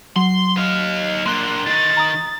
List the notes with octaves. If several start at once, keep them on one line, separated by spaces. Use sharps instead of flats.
F#3 C6
D#4 F5
A#3 D4 C6 F#6 G7
D#3 A6
A#5 D#6